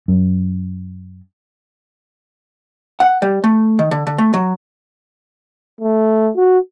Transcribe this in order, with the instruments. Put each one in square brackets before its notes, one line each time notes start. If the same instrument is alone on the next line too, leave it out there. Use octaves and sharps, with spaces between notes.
[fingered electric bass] F#2
[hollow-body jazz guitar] F#5
G3
A3
D#3
D3
D3
A3
F#3
[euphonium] A3
F#4